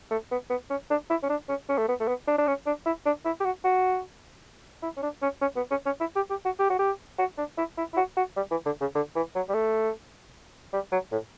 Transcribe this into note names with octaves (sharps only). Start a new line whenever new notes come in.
A3
B3
B3
C#4
D4
E4
C#4
D4
C#4
C#4
A3
B3
A3
B3
D4
D4
C#4
D4
E4
D4
E4
G4
F#4
F#4
E4
C#4
D4
C#4
C#4
B3
C#4
C#4
E4
G4
G4
F#4
G4
F#4
G4
F#4
D4
E4
E4
E4
F#4
F#4
G3
E3
D3
C#3
D3
E3
F#3
G3
A3
G3
F#3
A2